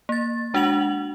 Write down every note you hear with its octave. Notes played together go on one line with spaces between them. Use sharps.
A#3 A6
G#3 D4 F#4 F#5 F7 F#7